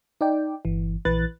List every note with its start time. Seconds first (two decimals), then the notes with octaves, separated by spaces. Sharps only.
0.21 D#4 D5 G5
0.65 G1 E3
1.05 A#1 E3 B4 F#6 A6